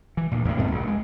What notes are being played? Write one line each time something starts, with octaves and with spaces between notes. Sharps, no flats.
E3
D2 A#2
E2 A2
G2 B2 A3 C4
A#1 C#3
G#3